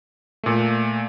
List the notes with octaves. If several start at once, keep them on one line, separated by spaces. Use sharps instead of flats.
A#2 A3